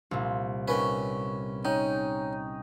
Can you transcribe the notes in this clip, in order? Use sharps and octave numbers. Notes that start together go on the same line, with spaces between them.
C2 A#2
D#3 C#4 B4
C#4 D#4 G5